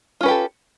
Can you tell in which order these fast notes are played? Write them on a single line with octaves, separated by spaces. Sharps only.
F4 C#4 B4 G4 A4